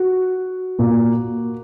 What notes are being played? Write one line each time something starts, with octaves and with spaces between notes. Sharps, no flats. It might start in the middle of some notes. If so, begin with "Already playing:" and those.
Already playing: F#4
A#2 A#3